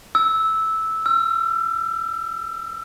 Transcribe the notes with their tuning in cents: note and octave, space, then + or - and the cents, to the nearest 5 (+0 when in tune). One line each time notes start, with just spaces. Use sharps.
E6 -10
E6 +40